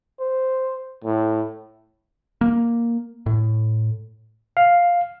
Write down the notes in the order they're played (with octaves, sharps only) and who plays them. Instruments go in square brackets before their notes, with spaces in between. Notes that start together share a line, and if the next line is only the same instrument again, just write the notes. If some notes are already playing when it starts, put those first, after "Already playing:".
[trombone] C5
A2
[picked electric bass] A#3
A2
[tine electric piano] F5